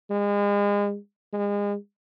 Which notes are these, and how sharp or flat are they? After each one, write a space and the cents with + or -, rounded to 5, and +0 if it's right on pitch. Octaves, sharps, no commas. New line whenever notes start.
G#3 -35
G#3 -35